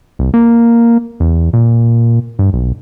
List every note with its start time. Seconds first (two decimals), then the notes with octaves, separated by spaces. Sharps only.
0.19 C2
0.34 A#3
1.20 E2
1.53 A#2
2.39 G2
2.53 B1